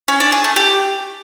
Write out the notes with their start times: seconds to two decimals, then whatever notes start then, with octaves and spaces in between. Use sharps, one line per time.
0.08 C#4
0.20 D4
0.32 G#4
0.44 A3
0.56 G4